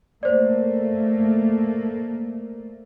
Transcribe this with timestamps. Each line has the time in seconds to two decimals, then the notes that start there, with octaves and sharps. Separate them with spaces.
0.23 A3 A#3 C5 D5